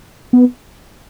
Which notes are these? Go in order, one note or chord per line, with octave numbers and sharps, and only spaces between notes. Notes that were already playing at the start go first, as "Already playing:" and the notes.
B3